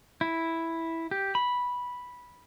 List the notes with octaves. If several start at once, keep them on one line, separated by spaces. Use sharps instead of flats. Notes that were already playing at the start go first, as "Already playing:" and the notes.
E4
G4
B5